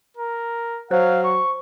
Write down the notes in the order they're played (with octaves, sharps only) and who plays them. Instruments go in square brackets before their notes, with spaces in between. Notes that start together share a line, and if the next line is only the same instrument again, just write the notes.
[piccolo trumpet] A#4
[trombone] F#3 [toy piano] C5 [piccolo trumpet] F5
[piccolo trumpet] C#6